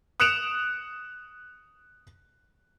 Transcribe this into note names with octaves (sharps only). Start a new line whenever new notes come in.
D#6 F#6 C#7 D7 E7 F7